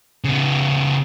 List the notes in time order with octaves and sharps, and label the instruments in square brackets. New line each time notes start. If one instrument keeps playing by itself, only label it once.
[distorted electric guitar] C#3 B3